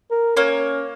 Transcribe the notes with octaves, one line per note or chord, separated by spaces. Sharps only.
A#4
A#3 C#4 C#5